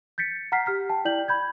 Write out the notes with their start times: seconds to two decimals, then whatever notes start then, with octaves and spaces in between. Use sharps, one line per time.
0.18 G6 A6 B6 C#7
0.52 F#5 A#5 F6 B6 C7
0.66 G4 F6 B6
0.89 G5 A5
1.05 E4 D5 G5 G6 F#7
1.28 B5 G6 G#6